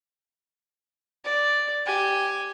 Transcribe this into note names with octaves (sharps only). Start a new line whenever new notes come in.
D5
G4 G#5